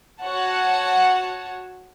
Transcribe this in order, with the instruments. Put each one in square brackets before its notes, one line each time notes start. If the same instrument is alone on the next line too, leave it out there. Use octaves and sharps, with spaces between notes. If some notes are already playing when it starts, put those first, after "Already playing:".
[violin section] F#4 C#5 F#5 A5